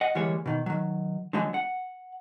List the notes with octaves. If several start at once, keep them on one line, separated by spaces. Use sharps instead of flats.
D#5 F#5
D2 E3 G3 G#3 A#3 C#5
B2 D#3
D#3 F#3
D3 D#3 F3 F#3 G#3
F#5